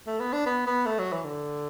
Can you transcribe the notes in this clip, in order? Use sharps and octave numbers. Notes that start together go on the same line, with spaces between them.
A3
B3
D4
B3
B3
A3
F#3
E3
D3